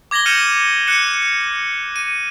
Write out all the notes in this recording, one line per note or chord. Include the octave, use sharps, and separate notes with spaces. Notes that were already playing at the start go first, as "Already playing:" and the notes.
D6 G#6 A#6 F#7 G7
F6 G6 C#7 D#7 E7 F#7
F#6 C#7 E7
D#7